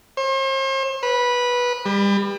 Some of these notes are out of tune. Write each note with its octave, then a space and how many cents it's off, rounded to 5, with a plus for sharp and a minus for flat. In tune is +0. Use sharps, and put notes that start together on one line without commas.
C5 +45
B4 -15
G3 +35